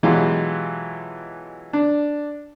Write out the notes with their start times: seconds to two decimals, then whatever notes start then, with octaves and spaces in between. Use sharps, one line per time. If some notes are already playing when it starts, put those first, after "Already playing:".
0.03 B2 E3 F#3 G#3 F4 G4
1.73 D4